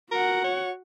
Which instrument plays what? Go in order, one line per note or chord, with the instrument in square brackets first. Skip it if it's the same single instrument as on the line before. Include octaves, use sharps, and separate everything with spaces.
[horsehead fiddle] F#4 F#5 [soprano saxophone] A#4
[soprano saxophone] C#5